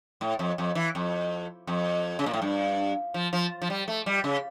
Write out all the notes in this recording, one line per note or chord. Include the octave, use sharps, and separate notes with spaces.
A2
F2
F2
E3
F2
F2
C#3
A#2
A2
G2
F3
F3
F3
G3
A3
G3
C#3